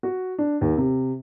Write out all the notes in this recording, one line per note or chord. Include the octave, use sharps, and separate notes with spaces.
F#4
D4
D#2
C3